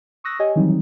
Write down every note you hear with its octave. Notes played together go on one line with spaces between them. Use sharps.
C#6 D#6 E6 F#6 A#6
G4 C#5 D#5 G#5
D#3 E3 F#3 G3 C4 D#4